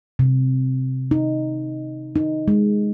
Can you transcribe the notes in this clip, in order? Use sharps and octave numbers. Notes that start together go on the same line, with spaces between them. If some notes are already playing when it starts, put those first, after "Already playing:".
C3
D#4
D#4
G#3